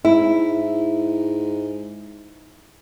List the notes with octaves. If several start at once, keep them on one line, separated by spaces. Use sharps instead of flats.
G#2 E4